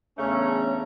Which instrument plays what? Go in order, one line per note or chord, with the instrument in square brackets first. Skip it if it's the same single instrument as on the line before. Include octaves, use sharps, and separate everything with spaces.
[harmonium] E2 D4 A#5 [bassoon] C#3 [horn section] A3 C#4